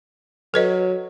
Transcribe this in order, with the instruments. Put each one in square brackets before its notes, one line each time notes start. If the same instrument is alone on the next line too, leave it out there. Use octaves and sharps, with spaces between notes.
[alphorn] F#3 [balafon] A4 B4 D#5